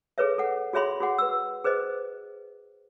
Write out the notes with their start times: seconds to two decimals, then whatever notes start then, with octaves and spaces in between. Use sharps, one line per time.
0.18 G#4 A4 B4 C#5 E5
0.38 A4 F#5
0.73 F#4 G#4 C#5 E5 B5 C6
1.00 F#4 G#4 F#5
1.18 B4 E6
1.64 G#4 B4 C5 D#5